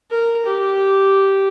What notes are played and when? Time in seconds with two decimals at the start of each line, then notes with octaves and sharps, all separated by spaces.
0.11 A#4
0.46 G4